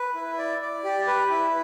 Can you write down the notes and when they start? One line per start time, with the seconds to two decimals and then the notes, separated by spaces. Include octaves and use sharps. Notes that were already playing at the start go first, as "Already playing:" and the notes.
Already playing: B4
0.15 E4
0.38 D5
0.61 D5
0.84 G4
1.07 B4
1.30 E4